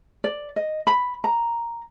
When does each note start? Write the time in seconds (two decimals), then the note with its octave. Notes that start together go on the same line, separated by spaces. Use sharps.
0.24 D5
0.56 D#5
0.87 B5
1.24 A#5